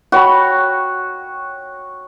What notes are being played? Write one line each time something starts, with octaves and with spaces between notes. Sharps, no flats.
F#4 C#5 G5 B5